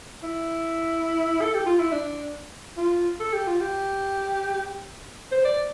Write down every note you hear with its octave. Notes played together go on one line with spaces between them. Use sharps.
E4
A4
G4
F4
E4
D4
F4
A4
G4
F4
G4
C5
D5